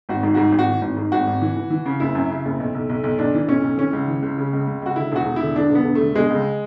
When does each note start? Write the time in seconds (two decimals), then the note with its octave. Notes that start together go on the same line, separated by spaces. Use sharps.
0.09 G#1 F#4
0.23 G#2
0.35 G#2 F#4
0.52 G#1
0.59 F#4
0.68 E3
0.81 G#1
0.97 G#2
1.12 G#1 F#4
1.27 G#1
1.42 E3
1.56 E3
1.70 E3
1.86 C#3
2.00 F#1 E4
2.15 F#2
2.30 C#3
2.45 F#1
2.60 B1
2.75 B1
2.89 B1
3.04 B1
3.19 B1 D4
3.34 E3
3.48 B1 C#4
3.64 B1
3.78 E3 C#4
3.93 C#2
4.08 E3
4.22 C#2
4.38 C#3
4.53 C#2
4.67 C#2
4.82 C#2 F#4
4.96 D3 E4
5.12 E1 F#4
5.26 E1
5.36 E4
5.42 D3
5.56 D3 D4
5.70 E1
5.75 B3
5.85 E1
5.95 D3 A3
6.15 B2 G#3
6.30 C#2